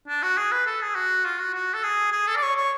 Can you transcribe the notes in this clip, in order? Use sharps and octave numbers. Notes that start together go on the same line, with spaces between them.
D4
F#4
G#4
B4
A4
G#4
F#4
F4
F#4
F#4
A4
G#4
G#4
A4
D5
C#5
C#5